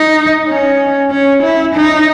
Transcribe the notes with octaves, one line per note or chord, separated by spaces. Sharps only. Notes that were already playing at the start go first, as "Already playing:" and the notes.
Already playing: D#4
C#4
C#4
E4
D#4